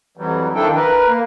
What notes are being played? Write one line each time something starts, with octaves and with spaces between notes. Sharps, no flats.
F2 E3 F#3 G3
D#3 F3 D4 E4 A4 G5
A#4 B4
A#3